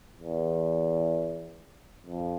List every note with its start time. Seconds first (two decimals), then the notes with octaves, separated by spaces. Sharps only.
0.18 E2
2.06 F2